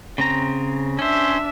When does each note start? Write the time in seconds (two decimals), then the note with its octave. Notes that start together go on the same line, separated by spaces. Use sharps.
0.18 C#3 C4 A#5
0.99 C#4 D4 C5 E5